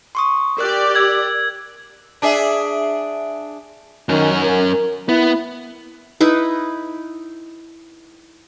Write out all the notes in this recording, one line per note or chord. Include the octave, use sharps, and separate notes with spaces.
C6 C#6 D#6
G4 A#4 D5 F#6
E6 G#6 F#7
D4 G#4 E5
F#2 D#3 C#4
A#4
B3 E4
D#4 E4 B4